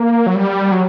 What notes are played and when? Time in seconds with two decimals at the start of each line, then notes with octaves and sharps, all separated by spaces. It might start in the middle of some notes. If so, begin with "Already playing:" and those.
Already playing: A#3
0.27 F#3
0.35 G3
0.72 F#3